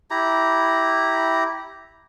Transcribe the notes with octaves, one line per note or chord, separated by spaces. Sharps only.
E4 G4 A#5